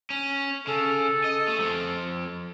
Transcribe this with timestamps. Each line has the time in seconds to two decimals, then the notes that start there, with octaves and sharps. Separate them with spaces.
0.10 C#4
0.67 C#3 A4
1.24 D#5
1.48 A3
1.60 F2 F3